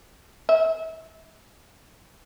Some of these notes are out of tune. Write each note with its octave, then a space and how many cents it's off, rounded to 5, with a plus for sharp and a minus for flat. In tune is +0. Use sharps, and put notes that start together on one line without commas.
E5 -35